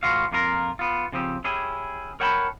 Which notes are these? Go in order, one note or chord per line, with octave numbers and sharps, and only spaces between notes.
A2 E3 F3 F4 F#4 F5
F2 A#3 F4 A#4 A#5
B3 F4
C#3 F3 C4 G4
C#4 E4 G4 G#4
A#4 C#5 F#5 G5 A5 B5